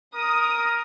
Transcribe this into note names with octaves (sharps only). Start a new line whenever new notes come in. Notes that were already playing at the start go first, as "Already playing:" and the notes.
A#4 D#6